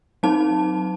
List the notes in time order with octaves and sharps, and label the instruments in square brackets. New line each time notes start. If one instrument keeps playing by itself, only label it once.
[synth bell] F#3 C4 D#4 A5